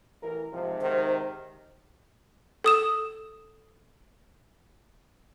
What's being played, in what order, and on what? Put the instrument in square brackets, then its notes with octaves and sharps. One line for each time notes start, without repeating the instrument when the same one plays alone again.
[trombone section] A1 E3 A#4
[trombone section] G#2 C3 [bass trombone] F3
[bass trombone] D#3 [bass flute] C5
[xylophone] A4 D#6 E7